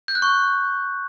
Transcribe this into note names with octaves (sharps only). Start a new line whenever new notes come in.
G6
F#6
C#6